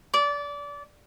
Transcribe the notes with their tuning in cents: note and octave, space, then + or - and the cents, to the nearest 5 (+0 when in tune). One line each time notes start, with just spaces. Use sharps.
D5 -25